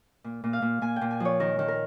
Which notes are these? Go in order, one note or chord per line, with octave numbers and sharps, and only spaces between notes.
A#2
A#2
F5
A#2
A#2 G#5
G5
A#2
G#5
F3 C#5
D#3 A#4
D#3
A#4